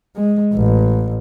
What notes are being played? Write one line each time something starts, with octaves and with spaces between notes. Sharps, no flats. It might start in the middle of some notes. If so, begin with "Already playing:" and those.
G#3
A1